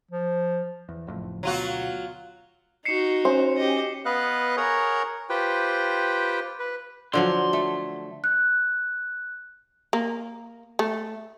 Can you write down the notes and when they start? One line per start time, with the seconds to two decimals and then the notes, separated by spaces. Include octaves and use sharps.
0.11 F3
0.89 E2
1.07 F#1 F2 A2
1.43 D2 B2 F#3 F4 F#4
2.85 D#4 F#4 C7 C#7 E7
3.25 C#4 C5
3.57 G4 D#5
4.05 B3 B4 D#5 F5 F#6
4.57 G#4 A#4 C#5 F#5 A#5
5.30 F4 G4 B4 C5 G5
6.59 B4
7.13 D3 F3 F#3 C6
7.53 A3
8.24 F#6
9.93 A#3
10.79 A3